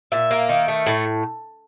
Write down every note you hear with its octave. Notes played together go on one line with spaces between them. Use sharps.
A#2 E5
A#3
D#3
A3
A2